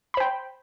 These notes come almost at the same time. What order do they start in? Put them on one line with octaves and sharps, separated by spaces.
B5 C5 G5